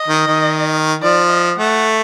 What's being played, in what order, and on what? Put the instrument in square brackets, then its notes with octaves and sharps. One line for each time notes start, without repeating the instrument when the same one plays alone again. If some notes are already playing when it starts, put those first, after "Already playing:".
Already playing: [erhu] D#5
[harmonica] D#3
D#3
[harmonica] F3 [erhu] D5
[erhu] D#5
[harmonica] A3 [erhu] F#5